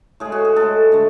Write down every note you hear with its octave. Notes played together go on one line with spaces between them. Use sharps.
A2 G#3 G#4
F#4
G#4
A2 G#3 A4
D3 A3